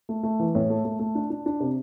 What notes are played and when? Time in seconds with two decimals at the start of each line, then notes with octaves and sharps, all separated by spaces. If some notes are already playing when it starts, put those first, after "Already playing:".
0.09 A3
0.23 A3
0.39 E3
0.55 A2
0.70 A3
0.85 A3
0.99 A3
1.15 D4
1.30 D4
1.46 D4
1.60 C3